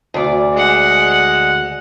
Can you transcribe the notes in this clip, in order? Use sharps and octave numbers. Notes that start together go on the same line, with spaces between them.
D2 D5
G#3 F#5